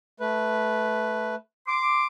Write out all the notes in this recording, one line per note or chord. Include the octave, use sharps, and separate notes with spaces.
A3 B4
C6 D6